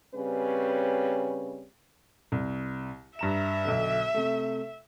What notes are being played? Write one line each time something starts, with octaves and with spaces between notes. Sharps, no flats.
C#3 G3 C4 C#4 B4
C2
G2 E5 A#5 E7
B1 D3
C3 A3